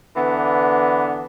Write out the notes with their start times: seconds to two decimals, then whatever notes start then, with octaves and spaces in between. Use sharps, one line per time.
0.17 D3 E3 B3 D4